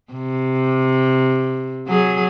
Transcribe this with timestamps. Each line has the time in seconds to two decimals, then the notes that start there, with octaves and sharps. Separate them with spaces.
0.13 C3
1.88 F#3 G#4